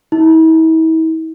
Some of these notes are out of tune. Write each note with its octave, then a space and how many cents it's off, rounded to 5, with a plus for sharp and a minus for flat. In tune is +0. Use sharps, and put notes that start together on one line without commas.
E4 -40